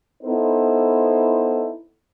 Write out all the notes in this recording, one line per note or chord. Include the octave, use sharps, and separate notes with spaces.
B3 D#4 E4 A4 C5